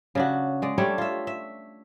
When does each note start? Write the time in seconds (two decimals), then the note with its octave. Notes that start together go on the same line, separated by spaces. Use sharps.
0.15 C#3 D4 F#4
0.62 G#3 D5
0.78 G3 A3 D4 C#5
0.98 F4 E5
1.27 E5